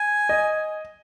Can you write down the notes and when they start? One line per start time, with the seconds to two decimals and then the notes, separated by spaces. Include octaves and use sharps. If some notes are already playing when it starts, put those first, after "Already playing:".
Already playing: G#5
0.29 D#5